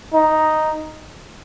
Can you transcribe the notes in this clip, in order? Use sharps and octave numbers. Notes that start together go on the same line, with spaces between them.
D#4